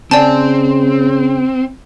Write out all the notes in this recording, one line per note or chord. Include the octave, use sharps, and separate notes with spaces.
C#3 C4 D5 G#5 A5